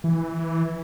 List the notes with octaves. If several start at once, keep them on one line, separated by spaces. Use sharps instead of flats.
E3